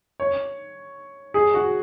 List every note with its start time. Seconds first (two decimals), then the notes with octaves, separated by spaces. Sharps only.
0.20 C#5
1.34 G#4
1.54 F#4